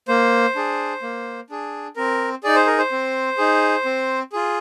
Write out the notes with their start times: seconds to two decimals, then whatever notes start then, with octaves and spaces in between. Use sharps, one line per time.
0.08 A#3 C5
0.56 D4 G#4
1.02 A#3
1.50 D4 G#4
1.96 C4 A#4
2.44 D#4 G#4 D5
2.56 C5
2.67 A#4
2.78 C5
2.92 C4
3.38 D#4 G#4
3.85 C4
4.32 F4 G#4